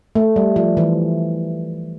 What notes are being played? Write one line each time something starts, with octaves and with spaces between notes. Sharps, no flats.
A3
G3
F3
E3